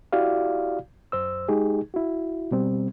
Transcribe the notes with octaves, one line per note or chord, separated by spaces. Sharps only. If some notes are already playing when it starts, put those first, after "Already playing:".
E4 F#4 G4 D5 F5
F#2 C5 E6
G#3 D#4 G4 G#4
E4 F#4
B2 G3 C4